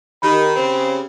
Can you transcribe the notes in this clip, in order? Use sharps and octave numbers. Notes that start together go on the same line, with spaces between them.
D#3 G4 B5
C#3 C4